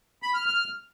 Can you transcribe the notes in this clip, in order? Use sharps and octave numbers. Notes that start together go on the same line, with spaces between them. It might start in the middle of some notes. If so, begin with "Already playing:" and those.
B5
F6
F6